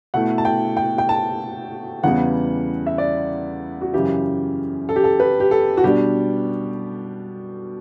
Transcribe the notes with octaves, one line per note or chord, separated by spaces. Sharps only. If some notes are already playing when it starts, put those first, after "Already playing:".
B2 A3 E4 F#5
A5
G5
G5
G5
A5
E2 C#3 G3 B3 F#5
E5
D5
F#4
F#2 C#3 E3 G4
A4
G4
A4
B4
G4
A4
F#4
B2 G3 D4 G4